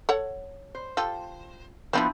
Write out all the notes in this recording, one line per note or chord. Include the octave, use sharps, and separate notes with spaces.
A4 C#5 F#5
C5
F4 G4 A4
F3 B3 C4 D4 E4